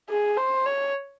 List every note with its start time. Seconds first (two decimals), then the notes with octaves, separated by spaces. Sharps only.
0.09 G#4
0.37 C5
0.66 C#5